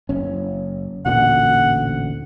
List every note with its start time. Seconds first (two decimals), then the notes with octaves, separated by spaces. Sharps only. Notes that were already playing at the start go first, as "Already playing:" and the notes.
0.09 F#1 C#4
1.06 A1 D2 A#2 F#5